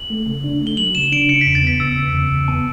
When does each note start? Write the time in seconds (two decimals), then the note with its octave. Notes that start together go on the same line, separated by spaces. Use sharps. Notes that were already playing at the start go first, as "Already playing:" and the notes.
Already playing: F#7
0.10 A3
0.27 C#3
0.44 D4
0.61 A3
0.67 G7
0.77 F#3 F#7
0.95 C#3 E7
1.12 D4 D7
1.29 C#3 C#7
1.41 E2 B6
1.55 A6
1.63 B3 B6
1.80 C#3 E6
1.97 E2
2.15 C#3
2.31 E2
2.48 B3 A5